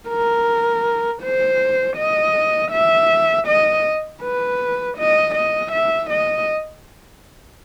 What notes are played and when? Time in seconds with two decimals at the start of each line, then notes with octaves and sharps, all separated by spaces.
0.09 A#4
1.22 C5
1.97 D#5
2.71 E5
3.48 D#5
4.22 B4
4.98 D#5
5.35 D#5
5.72 E5
6.10 D#5